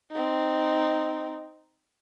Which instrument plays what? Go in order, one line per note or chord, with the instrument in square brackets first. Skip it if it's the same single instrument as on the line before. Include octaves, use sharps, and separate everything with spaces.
[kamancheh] C4 D#4